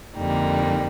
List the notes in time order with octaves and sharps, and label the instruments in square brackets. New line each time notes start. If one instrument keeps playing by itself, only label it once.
[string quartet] F2 D3 G3 A#3 D#4